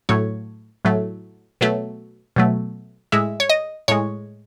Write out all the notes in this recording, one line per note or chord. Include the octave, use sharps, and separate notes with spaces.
A2 F#3 A3 C#5
A2 F#3 A3
B2 F#3 A3
B2 F#3 A3
A2 G#3 E5
C#5
D#5
A2 G#3 C#5